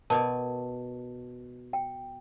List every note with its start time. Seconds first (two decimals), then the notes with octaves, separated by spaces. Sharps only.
0.10 B2 A#4 C#5 D5 A5
1.73 G5